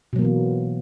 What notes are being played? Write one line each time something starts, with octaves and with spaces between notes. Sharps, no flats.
B2 E3 F#3 A#3 B3